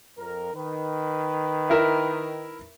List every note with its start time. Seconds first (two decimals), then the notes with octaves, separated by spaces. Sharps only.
0.17 F2 A#4
0.54 D#3 B4
1.70 E4 A#4 E5